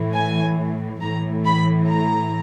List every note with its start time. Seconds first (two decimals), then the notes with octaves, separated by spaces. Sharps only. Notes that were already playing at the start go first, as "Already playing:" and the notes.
Already playing: A2 E3
0.14 G#5
1.01 A2 E3 A#5
1.45 B5
1.89 A#5